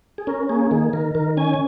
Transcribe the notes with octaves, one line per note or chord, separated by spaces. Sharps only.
G#4
C#4 A#4
A#3 G#4
D#3 G#4
D#3 A#4
D#3 A#4
C#4 G#5